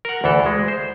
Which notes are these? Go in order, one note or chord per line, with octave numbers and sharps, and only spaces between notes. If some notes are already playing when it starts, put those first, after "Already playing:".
A#4 F#5
D2 E3 A4
G#3
C5